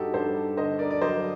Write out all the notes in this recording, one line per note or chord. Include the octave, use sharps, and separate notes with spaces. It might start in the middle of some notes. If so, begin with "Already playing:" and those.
Already playing: G2 D#4 F#4 G4 A4
G2 A4 C5
D3 C5 D#5
A#4 D5
D5
F#3 C5 D#5